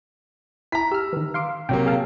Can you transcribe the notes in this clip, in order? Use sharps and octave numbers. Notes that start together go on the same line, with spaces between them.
E4 A#5 B6
G4 E6 F6
D#3 E3
F5 C6 D6
A1 C3 F#3 A#3 G5
G#4 F5 A5